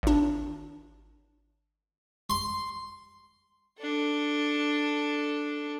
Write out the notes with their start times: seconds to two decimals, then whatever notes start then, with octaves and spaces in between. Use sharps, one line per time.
0.03 G#1 D4
2.30 C6
3.79 D4 A4